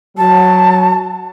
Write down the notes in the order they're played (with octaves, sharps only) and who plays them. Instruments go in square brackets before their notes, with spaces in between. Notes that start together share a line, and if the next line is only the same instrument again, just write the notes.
[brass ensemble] F#3 [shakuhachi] A5